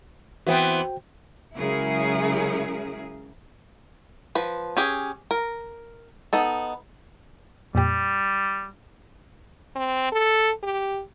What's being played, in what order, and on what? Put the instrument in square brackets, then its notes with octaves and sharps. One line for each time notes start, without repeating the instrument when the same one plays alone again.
[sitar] E3 B3 C4 [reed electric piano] F#4 C5 G5
[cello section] C#3 F#3 G#3 E4 G#4 A#4
[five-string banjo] F3 B4
C#4 G4 G#4
A#4
B3 D#4 A4
[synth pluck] F2 A#2 G4 [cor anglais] G3
[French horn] C4
A4
G4